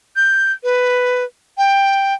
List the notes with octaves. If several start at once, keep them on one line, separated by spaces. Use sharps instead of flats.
G6
B4
G5